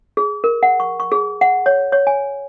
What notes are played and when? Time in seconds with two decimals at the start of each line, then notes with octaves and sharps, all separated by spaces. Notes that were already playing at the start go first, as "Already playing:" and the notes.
0.17 G#4
0.44 A#4
0.63 F#5
0.80 C#6
1.00 C#6
1.12 G#4
1.41 F#5
1.66 C#5
1.92 C#5
2.07 G#5